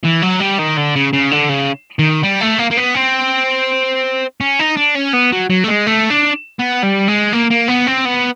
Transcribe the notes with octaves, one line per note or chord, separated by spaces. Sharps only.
E3
F#3
G3
D#3
D3
C#3
C#3
D3
C#3
D#3
G3
A3
A#3
A#3
B3
C4
C#4
D#4
D4
C#4
B3
F#3
F#3
A3
G#3
A3
D4
B3
G3
G#3
A#3
A#3
B3
C4
B3